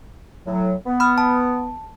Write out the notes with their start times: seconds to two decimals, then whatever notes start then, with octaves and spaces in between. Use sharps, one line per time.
0.47 A2 F#3
0.87 B3
1.00 B5 D#6 F6
1.18 A5